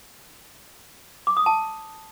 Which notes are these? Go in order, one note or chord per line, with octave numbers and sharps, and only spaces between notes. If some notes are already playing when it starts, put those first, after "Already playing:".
D6
D#6
A5